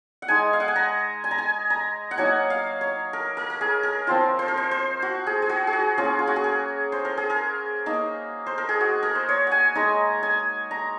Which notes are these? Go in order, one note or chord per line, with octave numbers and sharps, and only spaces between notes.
F#5
G#3 D#4 G#5
F5
F#5
G#5
A#5
G#5
A#5
G#5
A#5
F#5
F#3 A#3 D#4 G#5
F5
C#5
A#4
A#4
A#4
G#4
A#4
F3 C4 F4 C5
C5
A#4
C5
C5
F#4
G#4
G#4
F#4
G#4
F#4
A#3 C#4 F4 G#4
F4
F#4
G#4
A#4
C5
A#4
G#4
A#4
A#3 D#4
C5
A#4
G#4
F#4
A#4
C5
C#5
F#5 G#5
G#3 D#4 A#5
G#5
A#5